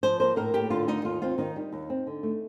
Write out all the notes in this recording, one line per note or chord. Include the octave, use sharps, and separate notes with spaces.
F3 C5
A#3 C5
A2 A#4
A2 G4
D3 F4
A3 D#4
D#2 F4
C4 F4
D#3 D#4
G3
D#2
C4
D3
A3